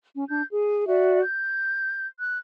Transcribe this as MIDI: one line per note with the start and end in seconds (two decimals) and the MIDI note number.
0.16 0.25 61
0.29 0.42 62
0.29 0.42 91
0.49 0.86 68
0.87 1.22 66
0.87 1.22 74
0.87 1.22 76
1.23 2.06 91
2.19 2.39 90